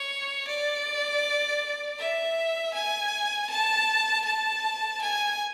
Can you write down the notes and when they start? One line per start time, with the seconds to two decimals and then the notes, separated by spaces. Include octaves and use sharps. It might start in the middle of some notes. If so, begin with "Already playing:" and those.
Already playing: C#5
0.48 D5
1.99 E5
2.74 G#5
3.50 A5
4.25 A5
5.02 G#5